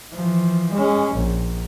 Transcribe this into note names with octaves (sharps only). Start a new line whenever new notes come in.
E3 F3
G#3 C#4
A#1